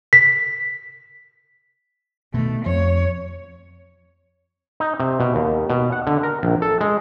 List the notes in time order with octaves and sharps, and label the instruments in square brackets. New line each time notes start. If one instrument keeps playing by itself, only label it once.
[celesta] B6
[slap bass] B2 D#3 [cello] A3
[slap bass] F2 [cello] C#5
[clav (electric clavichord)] D#4
C3
B2
D#2
B2
F#5
D3
A#4
A#1
A4
G#3